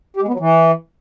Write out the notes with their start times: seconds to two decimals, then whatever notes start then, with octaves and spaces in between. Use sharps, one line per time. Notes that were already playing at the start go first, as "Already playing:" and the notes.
0.17 G4
0.22 G#3
0.28 B3
0.34 F#3
0.40 E3